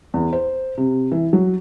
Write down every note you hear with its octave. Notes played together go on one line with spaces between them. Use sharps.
E2
C5
C3
E3
F#3